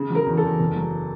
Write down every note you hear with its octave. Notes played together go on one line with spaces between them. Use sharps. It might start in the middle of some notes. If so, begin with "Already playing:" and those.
Already playing: C#3
F#3
A#4
E2
A4
E2
F#1
F#3